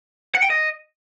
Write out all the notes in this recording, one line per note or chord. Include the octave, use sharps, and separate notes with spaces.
F#5
G5
D#5